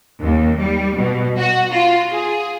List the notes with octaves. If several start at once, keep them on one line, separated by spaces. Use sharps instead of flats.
D#2
G3
B2
F#4
F4
G#4